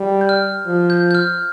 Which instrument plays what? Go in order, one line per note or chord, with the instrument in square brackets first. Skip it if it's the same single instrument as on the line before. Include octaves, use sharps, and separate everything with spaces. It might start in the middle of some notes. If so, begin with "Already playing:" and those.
Already playing: [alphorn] G3
[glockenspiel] G6
F6
[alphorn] F3
[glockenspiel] G6
G6
F6